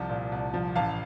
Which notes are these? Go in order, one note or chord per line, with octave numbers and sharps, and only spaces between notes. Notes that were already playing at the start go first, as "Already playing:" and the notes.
Already playing: C2 F3 A5
A#2
C2
F3
A1 F5 A5